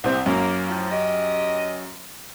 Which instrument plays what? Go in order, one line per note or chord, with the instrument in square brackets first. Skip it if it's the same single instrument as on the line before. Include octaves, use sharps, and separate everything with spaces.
[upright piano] C2 C4 [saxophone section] E4 G4 C5
[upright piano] F#2 C#4 [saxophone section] A#3
[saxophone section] A2 F3
G4 D#5